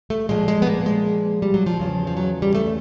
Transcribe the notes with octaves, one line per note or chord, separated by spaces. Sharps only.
A3
A#2 F3 G#3
G#3
B3
A#3
G#3
G3
F#3
F3
E2 C#3 F3
F3
F#3
G3
A3